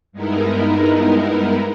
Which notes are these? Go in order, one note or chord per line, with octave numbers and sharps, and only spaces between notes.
G2 G#3 B3 D#4 E4 A#4